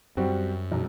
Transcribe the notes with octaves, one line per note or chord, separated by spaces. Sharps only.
F#2 G3 C4 F#4
E1 B1